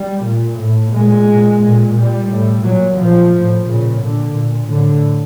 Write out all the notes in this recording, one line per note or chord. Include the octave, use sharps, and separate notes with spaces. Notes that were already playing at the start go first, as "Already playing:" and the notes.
Already playing: G3
A#2
A2
A#2 G#3
A#2
A#2
A#2 G3
A2
A#2 F#3
A#2 F3
A2
A#2 C#3
A#2 D3
A#2
A2 D3